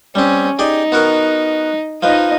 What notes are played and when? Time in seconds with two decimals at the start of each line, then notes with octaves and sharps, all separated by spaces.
0.15 G3 C4 C#4
0.59 D#4 G4 G#4 D5
0.92 B3 F#4 A#4
2.03 F3 D#4 B4 D#5